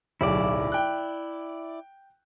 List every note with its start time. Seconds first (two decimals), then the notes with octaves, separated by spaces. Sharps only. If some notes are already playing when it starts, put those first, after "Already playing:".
0.21 D1 B1 E4 G4 D5
0.72 G5 F#6